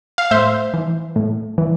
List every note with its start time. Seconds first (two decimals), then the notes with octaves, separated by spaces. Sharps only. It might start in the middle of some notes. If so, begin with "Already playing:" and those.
0.18 F5
0.31 A2 C5 E5
0.74 E3
1.16 A2
1.58 E3